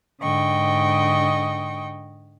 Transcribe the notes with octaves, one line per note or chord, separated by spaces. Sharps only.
G#2 D3 D#5 G5 C#6